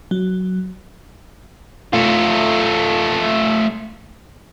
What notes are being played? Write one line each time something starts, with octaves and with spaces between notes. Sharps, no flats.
F#3
A3 F4